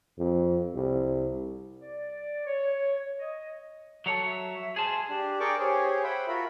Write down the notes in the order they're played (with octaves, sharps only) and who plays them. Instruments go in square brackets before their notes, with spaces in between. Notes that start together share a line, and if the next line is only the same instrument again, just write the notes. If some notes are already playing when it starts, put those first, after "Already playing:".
[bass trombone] F2
C2
[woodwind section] D5
C#5
D#5
[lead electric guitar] F#3 C#5 [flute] A4
[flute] E5
[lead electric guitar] G#4 C5 [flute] A5
[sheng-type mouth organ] D4 G4
G#4 A#4 D5 G5 C#6 D6
G4 G#4 C5 C#5 G#5
C5 E5 F#5 G5 B5
F4 F#4 A#4 E5 B5